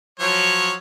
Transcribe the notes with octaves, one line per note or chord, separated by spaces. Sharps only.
F3 F#3 C#5